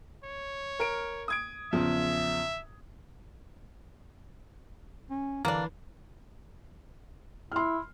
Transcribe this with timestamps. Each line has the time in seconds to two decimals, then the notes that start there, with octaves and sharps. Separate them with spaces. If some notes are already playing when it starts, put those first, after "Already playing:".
0.24 C#5
0.79 A#4 D7
1.28 D#6 G#6 D7
1.73 E2 C#3 F3 E5
5.10 C#4
5.45 D3 E3 A#3 D4
7.52 E4 C6 F6